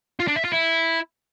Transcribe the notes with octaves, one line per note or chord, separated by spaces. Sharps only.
F4
D4
E5
F4
E4